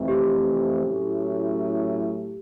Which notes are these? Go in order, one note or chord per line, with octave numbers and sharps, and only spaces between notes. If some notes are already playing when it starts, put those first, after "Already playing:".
Already playing: F2 C3 E3 A3 C4
G4
A2 F#3 A3 C#4 E4